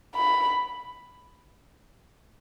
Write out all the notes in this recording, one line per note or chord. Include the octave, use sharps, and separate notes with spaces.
B5